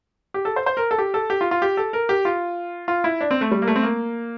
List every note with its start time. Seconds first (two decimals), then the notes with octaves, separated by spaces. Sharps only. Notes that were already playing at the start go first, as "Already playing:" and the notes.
0.34 G4
0.45 A4
0.56 C5
0.66 C5
0.77 A#4
0.91 A4
0.98 G4
1.14 A4
1.30 G4
1.41 F4
1.51 F4
1.62 G4
1.77 A4
1.93 A#4
2.09 G4
2.25 F4
2.88 F4
3.04 E4
3.21 D4
3.31 C4
3.41 A3
3.51 G3
3.62 A#3
3.67 A3
3.76 C4
3.83 A#3